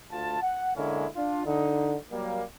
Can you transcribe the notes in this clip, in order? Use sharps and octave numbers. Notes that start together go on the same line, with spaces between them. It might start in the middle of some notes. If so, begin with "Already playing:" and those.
D2 F4 A5
F#5
D3 G#3 A#3 C#4 E4
D4 F4
D3 D#4
F#3 G3 A#3